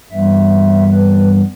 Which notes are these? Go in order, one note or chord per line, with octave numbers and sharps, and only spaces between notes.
G2 E3 G3 B3 E5
B4